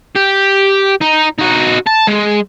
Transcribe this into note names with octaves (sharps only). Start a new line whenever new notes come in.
G4
D#4
D#4 F#4
A5
G#3